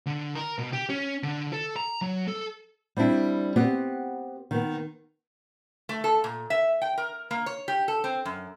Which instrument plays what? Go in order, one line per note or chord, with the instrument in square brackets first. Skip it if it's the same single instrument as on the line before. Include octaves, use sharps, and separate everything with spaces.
[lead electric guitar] D3
A#4
B2
G4
C#4
D3
A4
A#5
F#3
A4
[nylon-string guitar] G3 C4 D4 E4
B3 C4 G4
D#3 B3
[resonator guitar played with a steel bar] A3
A4
A#2
E5
G5
A#4
A#3
C#5
G4
A4
C4
F#2